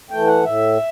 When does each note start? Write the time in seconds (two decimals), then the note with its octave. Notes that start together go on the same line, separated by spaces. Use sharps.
0.10 E3 A3 G5
0.27 F#5
0.44 A2 E5